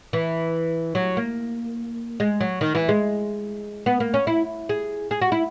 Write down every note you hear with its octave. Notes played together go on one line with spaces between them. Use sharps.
E3
F#3
A#3
G#3
F#3
D#3
E3
G#3
B3
A#3
C#4
E4
G#4
G#4
F#4
E4